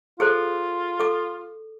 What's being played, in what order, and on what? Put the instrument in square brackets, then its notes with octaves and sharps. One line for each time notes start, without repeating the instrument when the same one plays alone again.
[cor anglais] F4 [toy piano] G#4 A4 C5
[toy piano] A4 D6